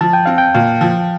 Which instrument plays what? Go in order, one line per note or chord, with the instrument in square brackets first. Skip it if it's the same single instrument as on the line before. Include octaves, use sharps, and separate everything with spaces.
[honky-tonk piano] F3 [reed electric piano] A5
[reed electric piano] G5
[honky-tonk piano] C4 [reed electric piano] F5
[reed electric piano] G5
[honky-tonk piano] A#2 [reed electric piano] F5
[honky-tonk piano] F3